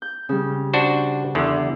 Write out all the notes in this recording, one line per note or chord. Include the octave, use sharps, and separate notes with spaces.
G6
C#3 G3
D4 F#4 C5
E2 D3